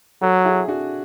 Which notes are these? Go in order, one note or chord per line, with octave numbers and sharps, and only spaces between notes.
F#3 F#4 A4
E4 G#4
D4 F#4